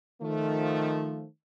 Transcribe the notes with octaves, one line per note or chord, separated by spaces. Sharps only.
D#3 F3 A3